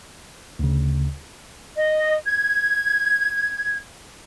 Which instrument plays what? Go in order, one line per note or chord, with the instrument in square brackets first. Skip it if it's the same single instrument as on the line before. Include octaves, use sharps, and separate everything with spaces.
[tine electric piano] D2 C#3
[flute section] D#5
G#6